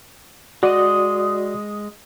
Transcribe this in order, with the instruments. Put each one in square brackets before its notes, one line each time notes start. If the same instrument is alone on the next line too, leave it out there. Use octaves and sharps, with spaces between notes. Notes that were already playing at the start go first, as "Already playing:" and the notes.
[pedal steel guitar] G#3 D#5 [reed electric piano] F#4 D5